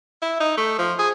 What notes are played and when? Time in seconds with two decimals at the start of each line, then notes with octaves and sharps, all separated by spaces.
0.22 E4
0.40 D#4
0.57 A3
0.78 F3
0.99 G#4